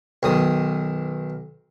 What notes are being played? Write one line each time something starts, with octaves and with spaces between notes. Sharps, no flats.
B1 D#3 D#6